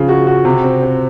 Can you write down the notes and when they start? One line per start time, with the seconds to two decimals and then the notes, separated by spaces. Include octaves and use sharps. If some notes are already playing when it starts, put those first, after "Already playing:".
Already playing: C#3 F3
0.09 F#4
0.27 F#4
0.45 C3
0.64 C4
0.82 C4